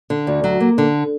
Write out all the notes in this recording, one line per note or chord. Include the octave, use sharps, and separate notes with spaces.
D3
D2
F#3
A#3
D3